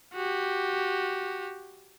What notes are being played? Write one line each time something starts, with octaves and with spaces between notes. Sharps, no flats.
F#4 G4